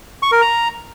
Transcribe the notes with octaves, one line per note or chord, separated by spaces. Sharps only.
C#6
A#4
A#5